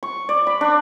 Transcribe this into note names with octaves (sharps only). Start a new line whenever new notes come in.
C#6
D5
B5
D4